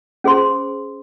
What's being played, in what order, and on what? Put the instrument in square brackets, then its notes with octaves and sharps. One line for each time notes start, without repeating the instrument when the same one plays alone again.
[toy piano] C#4 G#4 C5 C6